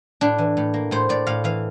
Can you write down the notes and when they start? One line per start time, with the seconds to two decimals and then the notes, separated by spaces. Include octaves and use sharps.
0.21 A2 D4
0.38 E3
0.57 A2
0.74 A#3
0.91 A2 C5
1.09 A2 D5
1.27 A2 F5
1.44 E3 F5